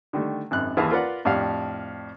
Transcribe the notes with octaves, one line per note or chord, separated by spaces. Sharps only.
D3 D#3 G3 A3
G#1 F#2 F#6
D#2 E3 G#4 F5 A5
F4 A#4 B4 D5 F#5
F2 A2 D4 G4 F5